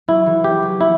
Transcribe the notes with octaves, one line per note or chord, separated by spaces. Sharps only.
F#3 E4
E3
E3 G4
F#3
B3 E4